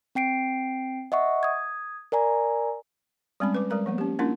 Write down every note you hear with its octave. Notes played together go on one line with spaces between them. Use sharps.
C4 G5 C7 D7
D#5 E5 F#5 C#6
D#6 G#6
A#4 D5 G#5 A#5
G3 G#3 C4 C#4 B5
B4 D6
G3 G#3 A#4 A#5
F3 A#3 B3
C#4 G4
A#3 C#4 D4 E4 F4 A#4